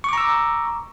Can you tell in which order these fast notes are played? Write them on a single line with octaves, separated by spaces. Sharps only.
C#6 D6 A#5 E6